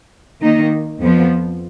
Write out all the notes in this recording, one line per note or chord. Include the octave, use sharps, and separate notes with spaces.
D#3 A#3 D#4
F2 F3 B3